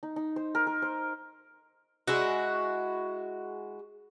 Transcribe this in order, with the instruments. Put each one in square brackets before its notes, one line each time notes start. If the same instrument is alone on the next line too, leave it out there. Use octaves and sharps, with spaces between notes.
[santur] D#4
D#4
C5
A#4
A#4
C5
[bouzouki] G#3 E4 F#4